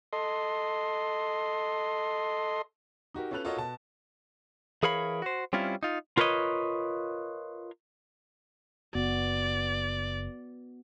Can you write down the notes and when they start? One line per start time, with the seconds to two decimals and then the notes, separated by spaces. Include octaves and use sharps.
0.13 A4 D#5 C6
3.14 D#4 F#4 G4 A#4
3.31 C#4 F4 A4 B4 F#6 F7
3.45 F4 F#4 A4 A#4 C#5 D#5
3.57 B2 A5
4.83 E3 G#4 A#4 C#5 F5 B5
5.22 F#4 C5
5.53 G3 C4 C#4 E4 F4
5.83 D#4 F4
6.17 F4 A#4 B4 C#5 D#5
8.95 F#1 B3 F#4 D5